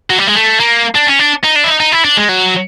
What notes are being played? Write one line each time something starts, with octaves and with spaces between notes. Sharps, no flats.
F#3
G3
G#3
A3
A#3
D4
C#4
D4
D#4
D4
E4
D#4
D#4
E4
D4
G#3
F#3